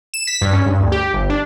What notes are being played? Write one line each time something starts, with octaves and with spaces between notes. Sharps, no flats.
E7
B6
G2
C#4
G2
D2
G4
G1
D4